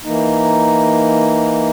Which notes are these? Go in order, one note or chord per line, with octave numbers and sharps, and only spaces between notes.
E3 A#3 D#4